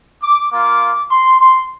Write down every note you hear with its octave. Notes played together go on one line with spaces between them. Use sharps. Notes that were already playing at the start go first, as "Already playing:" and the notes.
D6
A#3 F4 D6
C6
C6